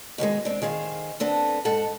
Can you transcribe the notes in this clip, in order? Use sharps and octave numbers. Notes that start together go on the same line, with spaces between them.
B2 D#3 F3 G#3
C4 D4
D#3 G#4 C5 F5
B3 C4 D4 A4
G#2 A4 F#5